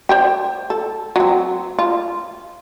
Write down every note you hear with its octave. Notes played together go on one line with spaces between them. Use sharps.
C5 D5 G5
A4
F#3 C4
F4